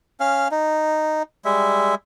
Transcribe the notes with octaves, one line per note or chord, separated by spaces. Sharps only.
C#4 F5
D#4
G3 G#3 E5